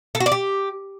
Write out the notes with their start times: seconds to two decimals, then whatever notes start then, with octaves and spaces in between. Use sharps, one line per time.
0.15 A4
0.20 F#4
0.26 D5
0.32 G4